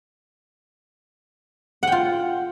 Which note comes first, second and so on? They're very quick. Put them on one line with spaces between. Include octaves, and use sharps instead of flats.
F#5 G5 F4